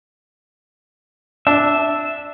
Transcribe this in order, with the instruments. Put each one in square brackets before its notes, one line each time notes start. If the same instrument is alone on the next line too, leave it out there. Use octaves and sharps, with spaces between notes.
[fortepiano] D4 [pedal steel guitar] E5